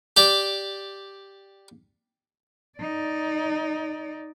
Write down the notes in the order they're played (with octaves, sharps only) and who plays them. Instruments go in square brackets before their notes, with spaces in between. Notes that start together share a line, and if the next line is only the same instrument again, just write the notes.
[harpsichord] G4 D5
[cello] D#4 D5